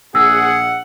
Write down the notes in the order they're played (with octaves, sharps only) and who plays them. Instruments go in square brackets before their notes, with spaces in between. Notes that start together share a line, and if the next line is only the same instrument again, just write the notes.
[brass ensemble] A#1 F#5 [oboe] G#4 [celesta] E6